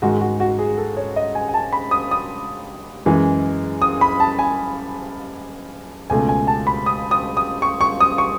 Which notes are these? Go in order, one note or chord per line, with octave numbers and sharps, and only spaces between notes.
G#2 D#3 G#3 F#4
F#4
F#4
G#4
A4
C#5
D#5
G#5
G#5
A5
B5
D#6
D#6
F#2 E3 G#3
D#6
B5
A5
G#5
C#2 B2 A3 G#5
G#5
A5
B5
D#6
D#6
D#6
C#6
C#6
D#6
C#6